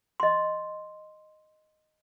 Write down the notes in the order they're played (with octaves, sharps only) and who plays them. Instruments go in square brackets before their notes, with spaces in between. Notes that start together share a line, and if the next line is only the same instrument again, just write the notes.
[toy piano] D#5 C6